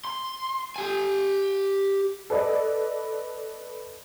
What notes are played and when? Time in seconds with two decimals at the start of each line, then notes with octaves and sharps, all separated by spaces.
0.05 C6
0.76 G4 G#5
2.30 A4 B4 D5 D#5